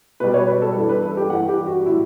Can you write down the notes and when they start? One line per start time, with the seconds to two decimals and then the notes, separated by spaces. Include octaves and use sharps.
0.20 B2 G3 B4
0.34 C#5
0.47 B4
0.62 A4
0.76 G2 E3 G3
0.89 B4
1.02 A4
1.17 G4
1.30 G2 E3 G3 F#5
1.49 G4
1.67 F#4
1.86 A2 F#3 E4